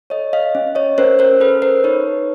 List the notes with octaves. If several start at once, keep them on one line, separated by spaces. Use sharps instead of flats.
A4 C#5 D#5
D#5 F5
C#4
C#5 D#5
C#4 A#4 C5
A#4 C5
A4 B4
A#4 C5
D#4 B4 C#5